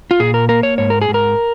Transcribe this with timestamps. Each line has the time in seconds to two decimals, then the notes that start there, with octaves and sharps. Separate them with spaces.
0.11 F4
0.20 A#2 G#4
0.34 A#4
0.49 A#3 A#4
0.63 C#5
0.78 G#2 C#5
0.90 A#4
1.02 G#4
1.08 G#2
1.14 A#4